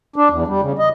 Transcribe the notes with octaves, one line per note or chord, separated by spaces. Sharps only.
D4
E2
G3
C#3
D#5